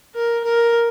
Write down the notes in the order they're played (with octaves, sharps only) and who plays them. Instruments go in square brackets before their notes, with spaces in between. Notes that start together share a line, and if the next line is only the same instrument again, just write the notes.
[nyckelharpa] A#4
A#4